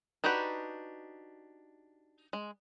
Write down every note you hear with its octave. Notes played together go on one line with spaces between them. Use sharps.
D4 D#4 F#4 G4 B4
G#3